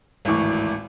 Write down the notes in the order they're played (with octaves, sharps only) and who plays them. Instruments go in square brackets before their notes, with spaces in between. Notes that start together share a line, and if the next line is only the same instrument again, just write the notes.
[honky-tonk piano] G#1 D2 A2 E3 C#6 D6